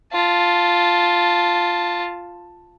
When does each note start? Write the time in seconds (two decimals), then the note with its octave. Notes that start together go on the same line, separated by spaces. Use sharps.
0.13 F4 A5